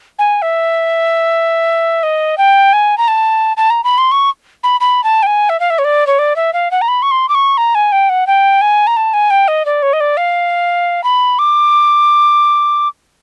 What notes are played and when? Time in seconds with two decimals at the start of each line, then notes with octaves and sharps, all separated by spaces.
0.19 G#5
0.42 E5
2.03 D#5
2.38 G5
2.73 G#5
2.98 A#5
3.08 A5
3.57 A5
3.70 A#5
3.84 B5
3.98 C6
4.11 C#6
4.63 B5
4.80 B5
5.04 A5
5.23 G5
5.26 G#5
5.49 E5
5.60 F5
5.70 E5
5.78 C#5
5.84 D5
6.07 C#5
6.19 D5
6.36 E5
6.53 F5
6.71 F#5
6.81 A#5
6.88 B5
7.02 C#6
7.11 C6
7.29 D6
7.35 C#6
7.57 A#5
7.75 G#5
7.92 G5
8.09 F#5
8.27 G5
8.61 G#5
8.87 A#5
8.97 A5
9.13 G#5
9.30 G5
9.48 D#5
9.65 D5
9.82 C#5
9.93 D#5
10.00 D5
10.17 F5
11.04 B5
11.39 D6